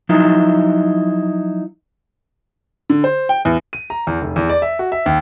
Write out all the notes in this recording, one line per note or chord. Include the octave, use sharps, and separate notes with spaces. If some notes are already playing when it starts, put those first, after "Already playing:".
F3 F#3 D#4 E4
D3
C5
G5
E2
D#7
A#5
E2
F1
E2
D5
E5
F#4
E5
D#2